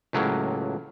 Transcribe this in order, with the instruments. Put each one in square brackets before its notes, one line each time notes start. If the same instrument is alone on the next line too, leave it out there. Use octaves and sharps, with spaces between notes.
[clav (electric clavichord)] C#2 A2 F#3 A#3